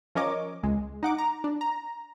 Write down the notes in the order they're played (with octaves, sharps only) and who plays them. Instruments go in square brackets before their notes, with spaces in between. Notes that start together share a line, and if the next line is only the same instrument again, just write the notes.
[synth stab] F3 C#4 A#4 C#5 D#5 D6
C#2 G#3
D#4 F#5 D6
A#5
D4
A#5